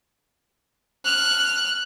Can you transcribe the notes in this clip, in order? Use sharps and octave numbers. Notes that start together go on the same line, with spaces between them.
F6 F#6